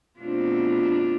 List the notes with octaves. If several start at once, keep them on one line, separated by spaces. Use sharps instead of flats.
B2 A3 C4 D4 F4